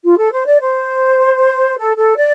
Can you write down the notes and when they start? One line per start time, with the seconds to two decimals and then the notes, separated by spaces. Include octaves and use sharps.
0.04 F4
0.18 A4
0.33 C5
0.47 D5
0.61 C5
1.79 A4
1.98 A4
2.17 D5